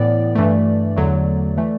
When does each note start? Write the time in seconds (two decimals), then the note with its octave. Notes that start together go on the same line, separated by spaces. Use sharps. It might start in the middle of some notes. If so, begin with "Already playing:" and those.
Already playing: A2 E3 B3 D5
0.35 G2 E3 A3
0.96 E2 D3 F#3 A3
1.57 E3 A3